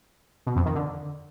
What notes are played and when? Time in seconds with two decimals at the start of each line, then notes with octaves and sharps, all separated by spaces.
0.46 B2
0.56 F2
0.65 D#3
0.75 D3